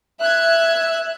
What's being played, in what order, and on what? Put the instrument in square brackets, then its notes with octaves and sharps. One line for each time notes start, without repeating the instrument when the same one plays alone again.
[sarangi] E5 [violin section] F#6 G#6